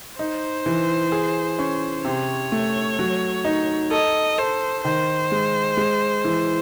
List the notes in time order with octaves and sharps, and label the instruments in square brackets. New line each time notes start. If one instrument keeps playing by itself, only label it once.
[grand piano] D#4 [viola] C5
[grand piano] E3
G#4
C#4
[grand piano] C3 [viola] C#5
[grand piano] A3
F#3
D#4
[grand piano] A4 [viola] D#5
[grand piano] A4 [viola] C5
[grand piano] D#3 [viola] C5
[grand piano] G#3
G#3
E3